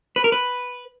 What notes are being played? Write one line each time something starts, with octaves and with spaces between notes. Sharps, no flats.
B4
A#4
B4